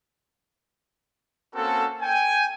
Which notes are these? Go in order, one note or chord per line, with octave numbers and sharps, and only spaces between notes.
A#3 C4 C#4 F#4 A4
G5 G#5